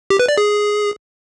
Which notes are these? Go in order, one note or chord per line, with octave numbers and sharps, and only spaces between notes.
G4
B4
D5
G#4